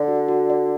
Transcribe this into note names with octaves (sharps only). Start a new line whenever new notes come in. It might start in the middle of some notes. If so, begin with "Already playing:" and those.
Already playing: D3 D5
F#4
F#4
D5